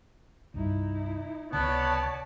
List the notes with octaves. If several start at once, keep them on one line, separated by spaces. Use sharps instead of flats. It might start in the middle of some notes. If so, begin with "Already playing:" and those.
C2 G2 D#4 E4
C#2 C3 B3 C#5 D5 A5